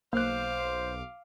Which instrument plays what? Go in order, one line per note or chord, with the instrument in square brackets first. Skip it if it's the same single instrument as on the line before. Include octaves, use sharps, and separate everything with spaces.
[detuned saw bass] B1 [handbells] A#3 F#6 [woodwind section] C5 [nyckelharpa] F5 D6